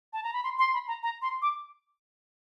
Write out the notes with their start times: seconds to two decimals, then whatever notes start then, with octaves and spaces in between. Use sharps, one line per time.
0.13 A5
0.23 A#5
0.33 B5
0.44 C6
0.59 C6
0.74 B5
0.88 A#5
1.03 A#5
1.22 C6
1.42 D6